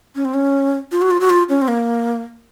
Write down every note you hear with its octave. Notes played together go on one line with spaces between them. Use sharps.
C#4
C4
C#4
F4
F#4
F4
F#4
F4
C#4
C4
A#3